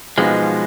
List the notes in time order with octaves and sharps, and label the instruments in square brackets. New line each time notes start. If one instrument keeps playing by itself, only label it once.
[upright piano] B1 B2 B3 D#4 [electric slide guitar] F3 G#3